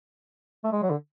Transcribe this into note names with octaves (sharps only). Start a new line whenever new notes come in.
A3
G#3
F#3
D3